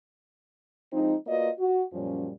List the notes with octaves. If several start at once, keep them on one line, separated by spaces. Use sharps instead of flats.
F3 G#3 C4 D#4
A#3 F4 F#4 B4 D5 D#5
F#4
F#2 A#2 F3 G3 C#4